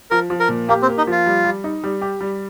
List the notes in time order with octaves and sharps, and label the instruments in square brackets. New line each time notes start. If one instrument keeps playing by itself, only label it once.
[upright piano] F3 [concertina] A#4
[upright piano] F3
[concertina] A#4
[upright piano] A#2
[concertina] A#3 [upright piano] G4
[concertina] C4
[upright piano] A#3
[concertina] D#4
[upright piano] F3 [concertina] F4
[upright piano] G3
G3
D#4
G3
G4
G3